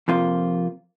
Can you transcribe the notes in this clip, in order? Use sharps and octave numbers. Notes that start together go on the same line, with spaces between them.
F2 C3 F3 A#3 F4